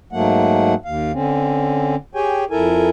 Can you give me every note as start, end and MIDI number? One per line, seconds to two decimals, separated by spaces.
0.12 0.74 44
0.12 0.74 54
0.12 0.74 57
0.12 0.74 58
0.12 0.74 78
0.85 1.12 39
0.85 1.12 77
1.13 1.96 50
1.13 1.96 60
1.13 1.96 61
2.15 2.44 67
2.15 2.44 68
2.15 2.44 73
2.15 2.44 79
2.15 2.44 80
2.51 2.89 41
2.51 2.89 64
2.51 2.89 69
2.51 2.89 70
2.51 2.89 80